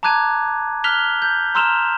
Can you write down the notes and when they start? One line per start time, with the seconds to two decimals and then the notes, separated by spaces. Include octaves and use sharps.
0.03 A5 A#5 D6 F#6 G#6 D#7
0.84 F6 F#6 B6 F7 G7
1.22 G6
1.55 A#5 C6 E6 F6 E7 F7